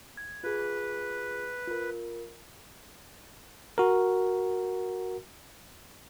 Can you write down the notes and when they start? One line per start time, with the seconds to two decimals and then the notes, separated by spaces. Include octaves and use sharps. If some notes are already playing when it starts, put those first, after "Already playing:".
0.17 G#6
0.44 F4 G#4 B4
1.67 F4 A#4
3.78 F#4 A#4